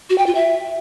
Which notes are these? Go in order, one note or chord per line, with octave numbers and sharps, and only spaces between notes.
F#4
G5
F4
E5